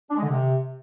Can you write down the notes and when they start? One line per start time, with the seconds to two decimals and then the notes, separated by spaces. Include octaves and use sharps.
0.10 D4
0.17 G#3
0.23 D3
0.29 C3